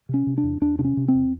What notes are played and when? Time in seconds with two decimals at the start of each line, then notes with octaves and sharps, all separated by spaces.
0.09 C3 C#4
0.27 C3
0.38 D4
0.44 E2
0.61 E2 D4
0.78 C3 D4
0.84 C#4
0.97 C3
1.08 C4
1.14 E2